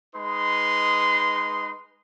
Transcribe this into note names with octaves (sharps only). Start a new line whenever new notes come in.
G#3 D#4 B4 C6